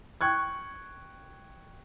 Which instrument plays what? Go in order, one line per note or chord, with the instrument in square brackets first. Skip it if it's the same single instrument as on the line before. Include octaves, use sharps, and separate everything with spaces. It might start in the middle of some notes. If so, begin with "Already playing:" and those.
[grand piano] G5 C#6 F#6 G#6